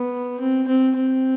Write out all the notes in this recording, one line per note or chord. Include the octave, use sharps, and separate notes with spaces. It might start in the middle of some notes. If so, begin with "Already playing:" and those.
Already playing: B3
C4
C4
C4